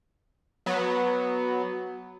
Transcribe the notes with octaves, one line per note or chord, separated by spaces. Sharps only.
F#3 B3